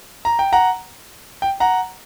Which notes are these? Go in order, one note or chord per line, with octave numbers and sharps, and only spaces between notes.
A#5
G5
F#5 A#5
G5
F#5 A#5